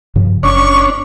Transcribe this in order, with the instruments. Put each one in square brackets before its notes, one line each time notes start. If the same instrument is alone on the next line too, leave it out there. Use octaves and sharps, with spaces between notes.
[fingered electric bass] G2 C#3 F3
[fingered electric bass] F#1 [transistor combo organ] C#4 D4 [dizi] C#6